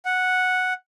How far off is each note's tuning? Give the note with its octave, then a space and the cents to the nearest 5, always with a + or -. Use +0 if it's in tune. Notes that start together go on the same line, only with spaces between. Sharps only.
F#5 -5